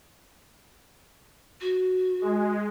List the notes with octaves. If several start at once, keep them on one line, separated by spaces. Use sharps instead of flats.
F#4
G#3